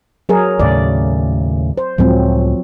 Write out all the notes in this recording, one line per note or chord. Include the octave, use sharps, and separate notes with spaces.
F#3 G#4 A#4
D#2 A2 C#3 D5
C5
C#2 A2 F3 F#3 G#3 C4